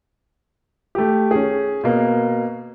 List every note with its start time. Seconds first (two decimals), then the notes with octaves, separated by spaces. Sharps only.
0.95 A3 G4
1.31 C#4 G#4
1.84 B2 A#3